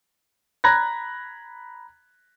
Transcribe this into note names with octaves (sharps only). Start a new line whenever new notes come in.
A#5 B5 F#6 G#6 A#6